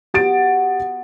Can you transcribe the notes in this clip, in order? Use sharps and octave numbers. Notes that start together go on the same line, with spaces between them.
B3 F#4 G4 A6 D7